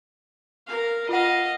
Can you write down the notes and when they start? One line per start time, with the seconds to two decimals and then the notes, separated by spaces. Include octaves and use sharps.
0.67 A#4 F5
1.09 F4 D#5 F5 F#5